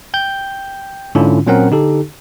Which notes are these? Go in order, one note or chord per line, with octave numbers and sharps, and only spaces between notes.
G5 G6
G#2 D3 C#4 D4 E4 F4
A#2 F#3 C4 C#4 A#4 F#5
D3 D#4 G4 A4